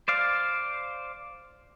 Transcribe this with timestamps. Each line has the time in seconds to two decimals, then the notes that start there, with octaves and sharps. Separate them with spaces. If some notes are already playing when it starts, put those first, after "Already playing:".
0.08 C5 D5 F5